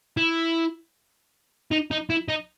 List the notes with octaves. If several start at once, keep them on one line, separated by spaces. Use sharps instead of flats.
E4
D#4
D#4
E4
D#4